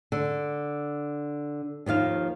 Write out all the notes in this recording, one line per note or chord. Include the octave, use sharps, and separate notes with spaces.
D3
D#2 D#3 F3 F5